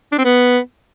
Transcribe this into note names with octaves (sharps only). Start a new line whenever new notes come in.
D4
C4
B3